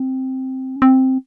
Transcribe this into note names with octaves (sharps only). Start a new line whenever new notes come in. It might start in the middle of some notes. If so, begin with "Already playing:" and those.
Already playing: C4
C#4
C4